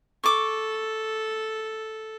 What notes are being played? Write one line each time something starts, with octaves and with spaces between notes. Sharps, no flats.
A4 C#6 D6